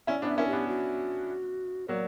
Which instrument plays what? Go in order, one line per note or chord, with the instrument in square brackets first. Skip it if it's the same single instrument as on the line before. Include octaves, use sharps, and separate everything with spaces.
[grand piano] C#4 E4 [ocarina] D5
[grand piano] B3 D4
[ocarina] E5
[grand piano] C#4 E4 [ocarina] A#4
[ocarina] G4
[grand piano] B3 D4
[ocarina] F#4
[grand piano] F#3 A#3 [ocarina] D5